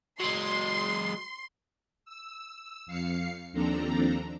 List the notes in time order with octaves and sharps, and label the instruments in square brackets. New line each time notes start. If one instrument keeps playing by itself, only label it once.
[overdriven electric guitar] F#3 G#3 [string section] C6
[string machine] E6
F2 F5 C7 C#7
D#2 F3 C4 D4 A4 A#5